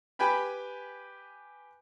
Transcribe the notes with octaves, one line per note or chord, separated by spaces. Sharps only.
G4 B4 G5 G#5 B5